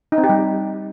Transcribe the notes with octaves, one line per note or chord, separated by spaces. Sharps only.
D#4
C4
G4
G3